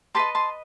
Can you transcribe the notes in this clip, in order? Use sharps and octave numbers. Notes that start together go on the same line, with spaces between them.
G4 B4 D#5 A5 C6
A5 C6